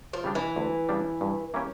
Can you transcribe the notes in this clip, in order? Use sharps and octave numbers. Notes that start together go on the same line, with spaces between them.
F3
C#3 G3 D4
E3
D2
C#3 G3 D4
G2
E3 A#3 C#4 G4